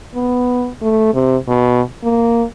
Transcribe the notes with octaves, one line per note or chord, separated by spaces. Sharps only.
B3
A3
C3
B2
A#3